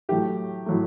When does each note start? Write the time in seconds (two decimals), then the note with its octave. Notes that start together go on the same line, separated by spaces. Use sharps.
0.09 A2 F#3 A3 G4
0.66 A2 F#3 A3